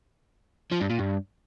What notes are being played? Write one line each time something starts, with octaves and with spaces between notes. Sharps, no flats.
F3
G2
A#2
G2